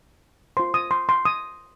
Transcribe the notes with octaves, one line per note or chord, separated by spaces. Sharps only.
F4 C5 C6
D#6
C6
C6
D#6